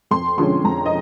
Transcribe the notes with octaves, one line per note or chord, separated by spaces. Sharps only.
F2 C6
D3 F3 G#3 C#4 C6
F2 A#5
D#5